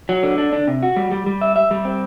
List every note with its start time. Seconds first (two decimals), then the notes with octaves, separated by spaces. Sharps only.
0.09 F#3
0.23 D3
0.38 D4
0.53 D4
0.67 C3
0.83 F#4
0.96 G3
1.11 G3
1.26 G3
1.41 E5
1.56 E5
1.71 G3
1.85 C4